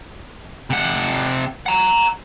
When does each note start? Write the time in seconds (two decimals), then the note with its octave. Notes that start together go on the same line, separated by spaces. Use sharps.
0.70 C3 F#5
1.66 F#5 A#5